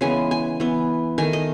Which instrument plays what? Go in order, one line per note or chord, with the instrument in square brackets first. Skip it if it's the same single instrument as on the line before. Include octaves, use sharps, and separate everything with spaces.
[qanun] C#3 E3 G#3 B3 G#5
G#5
E3 B3
D#3 A3 G#5
D#5